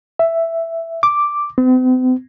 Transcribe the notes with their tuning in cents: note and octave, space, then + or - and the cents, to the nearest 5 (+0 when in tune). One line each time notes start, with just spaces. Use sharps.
E5 +5
D6 +0
C4 -45